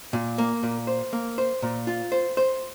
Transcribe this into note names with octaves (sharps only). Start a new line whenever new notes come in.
A#2
A#3
A#2
C5
A#3
C5
A#2
F4
C5
C5